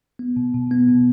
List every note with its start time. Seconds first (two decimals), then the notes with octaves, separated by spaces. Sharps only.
0.19 B3
0.36 B2
0.54 B2
0.71 B3
0.88 B2